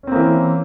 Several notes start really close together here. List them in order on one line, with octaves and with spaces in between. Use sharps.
C#4 C4 A#3 E3